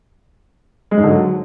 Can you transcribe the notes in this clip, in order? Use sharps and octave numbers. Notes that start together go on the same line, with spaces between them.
G#3
G#2
D3
F#3